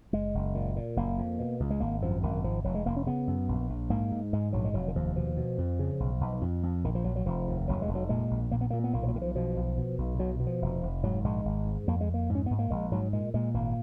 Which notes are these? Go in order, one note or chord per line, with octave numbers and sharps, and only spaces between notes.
F#1 G#3
F#1
A#2
A#2
F#1 A#3
F2
B2
C#2
G#3
G#1 A#3
F#2 F3
G#1 D#3
G#1 F3
F1 F#3
G#3
F1 A#3
C#4
C#3 B3
F#2
A#1
A#1
G#2 A#3
G#2
G#2 G#3
A#1 F#3
G#3
F1 F#3
D#3
D#2 F3
B2 F3
B2
F2
C#3
B1
B1
F2
F2
A#1 D#3
F3
A#1 F#3
F#3
F1 F3
D#2
F1 F#3
G#3
F1
F#3
A#2 G#3
A#1
A#2 A#3
B3
A#2 A#3
B3
B1 A#3
F3
F#3
B1 D#3
F3
B2 F3
B1
B2
B1
B2 F#3
B2
F3
F1
F1
G#2 F#3
A#1 G#3
G#1
G#2
F2 A#3
G#3
F2
A#3
G#2
C#4
G#2 B3
A#3
A#1 G#3
G#2 F#3
A#2 G#3
A#2 G#3
G#1 A#3